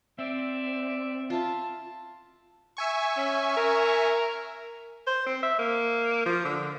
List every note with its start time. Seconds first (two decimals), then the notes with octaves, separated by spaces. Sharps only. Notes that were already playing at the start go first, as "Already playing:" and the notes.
0.19 C4 D5 E5
1.30 F4 E5 A5
2.77 E5 G#5 C#6
3.17 C#4
3.56 A#4
5.07 C5
5.26 C4
5.43 E5
5.59 A#3
6.26 F3
6.45 D3